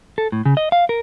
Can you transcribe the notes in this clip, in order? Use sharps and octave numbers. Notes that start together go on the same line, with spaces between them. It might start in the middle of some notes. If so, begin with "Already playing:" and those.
A4
A2
C#3
D#5
F5
A#4